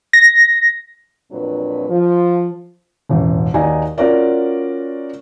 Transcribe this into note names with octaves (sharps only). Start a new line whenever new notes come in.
A#6
F2 A#2 F#3 C4 D4 B4
F3
E1 A1 F#2
D#2 D#4 F#4 D5 G#5
C#4 F4 F#4 A#4 C#5 D5